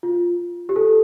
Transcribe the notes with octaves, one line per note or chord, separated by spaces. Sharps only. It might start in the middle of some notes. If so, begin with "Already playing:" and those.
F4
G4
A4